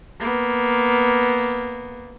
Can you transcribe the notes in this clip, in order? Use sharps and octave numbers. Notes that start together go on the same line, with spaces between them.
A#3 B3